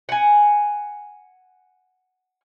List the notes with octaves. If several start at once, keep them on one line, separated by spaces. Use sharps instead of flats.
F#5 G#5